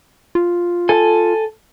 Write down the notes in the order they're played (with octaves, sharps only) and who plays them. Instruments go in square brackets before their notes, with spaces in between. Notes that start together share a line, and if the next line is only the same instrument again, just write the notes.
[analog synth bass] F4
[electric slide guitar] A4 G#5